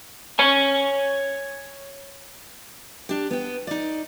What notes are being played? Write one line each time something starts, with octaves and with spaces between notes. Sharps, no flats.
C#5 G#5
D4 G4
B3 G5
D#4 D5